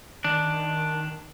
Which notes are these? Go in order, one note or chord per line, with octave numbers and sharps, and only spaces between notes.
D#3 D4